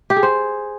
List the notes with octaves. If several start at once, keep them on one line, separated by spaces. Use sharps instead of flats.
G4
G#4
C5